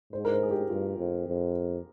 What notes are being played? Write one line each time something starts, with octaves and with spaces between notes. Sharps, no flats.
G#2 C5
A#4
C5
G#4
G4
G2 F4
F2
F2